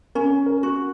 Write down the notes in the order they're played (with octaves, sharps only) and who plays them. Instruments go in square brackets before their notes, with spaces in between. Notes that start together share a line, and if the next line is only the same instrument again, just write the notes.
[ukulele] C#4 [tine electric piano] A#4
[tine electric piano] A#4
[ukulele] F#4